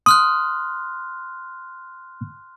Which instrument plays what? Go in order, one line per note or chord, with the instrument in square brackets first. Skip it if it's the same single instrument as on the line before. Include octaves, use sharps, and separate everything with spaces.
[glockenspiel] C6 F6 F#6 [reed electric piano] D#6